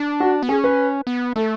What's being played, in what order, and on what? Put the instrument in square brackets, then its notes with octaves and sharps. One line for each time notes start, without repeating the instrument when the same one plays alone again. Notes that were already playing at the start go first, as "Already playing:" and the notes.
Already playing: [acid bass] D4
[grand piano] F#4
[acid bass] B3
[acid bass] C#4 [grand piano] G#4
[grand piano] B4
[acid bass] B3
[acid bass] A3 [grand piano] A4